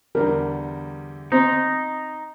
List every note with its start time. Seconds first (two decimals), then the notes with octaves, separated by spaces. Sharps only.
0.15 E2 D3 G3 A#4
1.32 C4 D#4